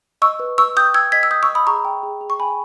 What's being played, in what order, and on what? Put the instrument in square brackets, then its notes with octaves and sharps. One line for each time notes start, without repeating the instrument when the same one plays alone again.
[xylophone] D#5 C#6 E6
B4
B4 C#6 E6
G5 D#6 G6
G5 E6 G#6
D#5 G#6 B6
E6
D#5 D#6 G6
C#6 E6
D#5
B5 D#6
G#4 A#5 C#6
G5
G#4
G#4
C#6
G5 G#5 B5